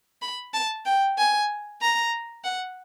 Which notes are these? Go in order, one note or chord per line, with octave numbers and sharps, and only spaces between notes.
B5
A5
G5
G#5
A#5
F#5